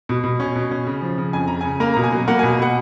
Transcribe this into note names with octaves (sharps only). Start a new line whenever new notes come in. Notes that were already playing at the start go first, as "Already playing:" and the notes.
B2
B2
C#4
B2
C#4
C#3
F3
C#3
F2 G#5
C#3 A#5
C#3 G#5
A#3 A#5
B2 A#5
G#5
F#3
A#3 F#5
B2 G#5
B2 F#5